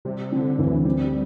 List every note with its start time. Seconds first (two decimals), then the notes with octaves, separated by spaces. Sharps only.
0.05 C3 G3
0.32 D3 C4
0.58 D2 E3
0.85 G3 C4